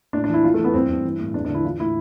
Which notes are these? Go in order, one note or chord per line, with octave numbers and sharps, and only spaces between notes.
A2 D4
D4
E3 E4
E3 F4
A3
E3
B3
G2 C4
G2
E3
A2
E2 D4
D4
D3
E4
E3 F4
A2 E4